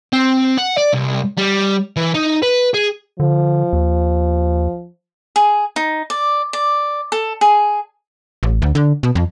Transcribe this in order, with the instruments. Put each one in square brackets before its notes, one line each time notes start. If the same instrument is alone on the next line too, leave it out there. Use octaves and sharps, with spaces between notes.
[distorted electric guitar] C4
F#5
D5
C2
G3
E3
D#4
B4
G#4
[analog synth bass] D3 [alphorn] F3
[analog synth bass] D#2
[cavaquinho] G#4
D#4
D5
D5
A4
G#4
[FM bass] A1
D2
D3
B2
F2